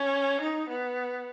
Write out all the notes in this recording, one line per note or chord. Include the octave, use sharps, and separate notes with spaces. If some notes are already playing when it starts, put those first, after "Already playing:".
Already playing: C#4
D#4
B3